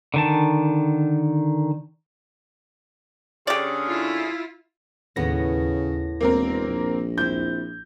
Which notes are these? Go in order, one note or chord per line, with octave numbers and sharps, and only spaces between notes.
D3 D#3 A5
D3 C#4 G4 G#4 D5
E4 F4
D#2 A2 C#3 A3 B3 A#6
E1 A#3 C4 A#4
A#1
C4 E4 G6